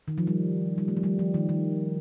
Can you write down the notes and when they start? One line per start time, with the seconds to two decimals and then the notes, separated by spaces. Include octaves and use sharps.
0.08 D#3
0.18 F3
0.27 G3
0.78 G3
0.88 A3
0.97 F3
1.03 G3
1.19 F3
1.34 D#3
1.49 D#3